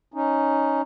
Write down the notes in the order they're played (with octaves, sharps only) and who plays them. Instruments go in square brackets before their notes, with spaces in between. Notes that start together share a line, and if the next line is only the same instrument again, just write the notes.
[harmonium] C#4 D#4